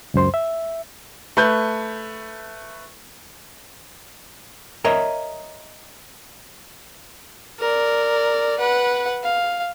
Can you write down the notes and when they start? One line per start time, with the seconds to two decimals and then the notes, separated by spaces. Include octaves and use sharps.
0.14 C#2 F#2 C5 C6
0.34 E5
1.37 A3 B4 G6
4.84 A#4 C#5 D#5 E5 A#5
7.59 A#4 D5
8.59 B4 F#5
9.24 F5